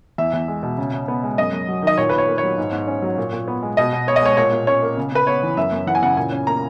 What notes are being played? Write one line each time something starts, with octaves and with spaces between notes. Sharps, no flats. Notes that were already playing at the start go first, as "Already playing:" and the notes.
E2 E5
E2
G#3
B2
C#3
C#3
B3
G#3
F#2 D#5
F#2
F#3
D#3 D#5
A#2 C#5
B4
A#2
C#5
A#3
C#5
F#3
G#2
G#2
C#4
F#3
A#2
A#2
B3
G#3
B2 D#5
B2
B3 C#5
D#5
G#3 C#5
A#2 C#5
A#2
C#4 C#5
A#3
C#3
C#3 B4
B3 C#5
E3
F#2 E5
F#2
E3 F#5
G#5
C#3 F#5
A#2 G#5
C#4
A#3 A#5